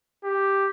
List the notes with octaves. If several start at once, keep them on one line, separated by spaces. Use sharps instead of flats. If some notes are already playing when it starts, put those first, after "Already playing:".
G4